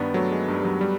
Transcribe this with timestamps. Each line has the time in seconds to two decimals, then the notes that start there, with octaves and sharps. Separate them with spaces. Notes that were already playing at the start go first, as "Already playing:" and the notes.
Already playing: G2 D#3 B3 D4
0.14 F#3 A3
0.31 G#3
0.47 G2 G3
0.59 G3
0.64 F#3
0.81 G3